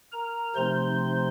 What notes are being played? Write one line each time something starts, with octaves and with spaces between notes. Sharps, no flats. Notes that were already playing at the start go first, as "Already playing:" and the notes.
A#4 A#5
C3 F3 A3 C4 D#4 C5 C6